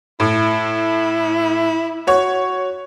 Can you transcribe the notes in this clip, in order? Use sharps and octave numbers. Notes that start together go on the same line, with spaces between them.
A2 E4
F#4 C#5